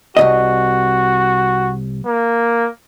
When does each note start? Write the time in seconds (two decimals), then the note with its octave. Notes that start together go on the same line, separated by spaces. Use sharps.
0.17 C2 G#2 F#4 D#5
2.06 A#3